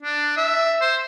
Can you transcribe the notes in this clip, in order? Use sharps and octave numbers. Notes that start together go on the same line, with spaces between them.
D4
E5
C5